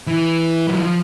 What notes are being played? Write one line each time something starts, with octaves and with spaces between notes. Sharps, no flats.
E3
F#3
F3